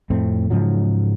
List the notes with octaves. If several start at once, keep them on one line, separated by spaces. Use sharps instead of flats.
F2 A2 A3 C4
G#2 C#3 F3 F#3